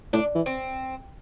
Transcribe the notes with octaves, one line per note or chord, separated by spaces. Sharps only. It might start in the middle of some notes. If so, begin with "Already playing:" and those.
A2 D4
E3
C4